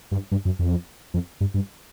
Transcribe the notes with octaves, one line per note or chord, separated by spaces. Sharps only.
G2
G2
F#2
F2
F2
G2
G2